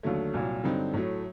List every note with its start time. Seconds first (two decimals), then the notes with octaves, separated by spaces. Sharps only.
0.03 D#2 D3 F#3 A3
0.34 C2 A#2 F#3
0.63 G2 D3 F#3 C4 D#4
0.93 A2 F#3 A3